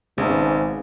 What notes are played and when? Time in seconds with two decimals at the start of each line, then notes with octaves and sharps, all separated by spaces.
0.18 G#1 G#2 C#3 B3 C#4 A5